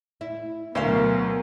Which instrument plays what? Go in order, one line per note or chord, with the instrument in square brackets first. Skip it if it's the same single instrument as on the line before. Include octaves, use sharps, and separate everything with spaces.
[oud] E4
[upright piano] D2 [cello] B2 F#3 [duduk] A#4 [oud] C5 E5 F5